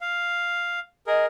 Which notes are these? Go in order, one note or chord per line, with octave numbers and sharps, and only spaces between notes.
F5
G#4 A#4 D#5